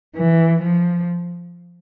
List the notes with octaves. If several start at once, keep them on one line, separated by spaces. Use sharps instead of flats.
E3
F3